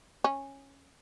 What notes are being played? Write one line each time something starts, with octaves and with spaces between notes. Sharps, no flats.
C#4